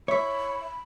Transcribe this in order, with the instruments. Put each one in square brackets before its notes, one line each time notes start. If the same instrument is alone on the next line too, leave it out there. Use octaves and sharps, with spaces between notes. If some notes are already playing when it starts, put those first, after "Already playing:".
[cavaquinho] E4 E5 [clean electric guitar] C#5 [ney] B5